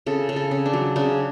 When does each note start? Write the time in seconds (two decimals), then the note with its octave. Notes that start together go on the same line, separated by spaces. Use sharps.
0.06 C#3 A4
0.29 C#3
0.36 A4
0.51 C#3
0.66 D4
0.73 F#3
0.96 C#3 D4